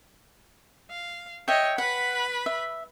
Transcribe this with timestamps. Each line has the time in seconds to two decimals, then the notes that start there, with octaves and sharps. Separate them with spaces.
0.90 F5
1.48 C#5 D#5 E5 G5
1.78 B4 F#5 B5
2.46 E5